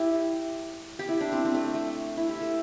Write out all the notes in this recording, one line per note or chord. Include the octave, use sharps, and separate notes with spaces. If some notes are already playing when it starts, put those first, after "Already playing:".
Already playing: E4 G4
G4
E4
D4
C4
C4
A3
A3
E4
G4
A4